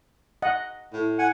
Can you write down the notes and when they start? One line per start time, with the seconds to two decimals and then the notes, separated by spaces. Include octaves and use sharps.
0.42 D#5 F#5
0.92 A2
1.19 F#5 G#5